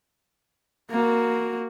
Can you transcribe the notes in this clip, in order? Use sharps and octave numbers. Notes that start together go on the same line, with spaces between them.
A#3 F#4